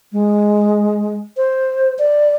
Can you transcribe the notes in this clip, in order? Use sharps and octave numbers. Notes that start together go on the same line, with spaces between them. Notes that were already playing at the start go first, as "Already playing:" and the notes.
G#3
C5
D5